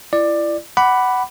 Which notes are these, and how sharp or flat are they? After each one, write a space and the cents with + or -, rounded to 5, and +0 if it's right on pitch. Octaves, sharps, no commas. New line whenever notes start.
E4 +30 D5 +15
F#5 +15 B5 +0 D6 +0